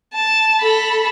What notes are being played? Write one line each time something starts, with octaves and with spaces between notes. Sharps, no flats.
A5
A4 B5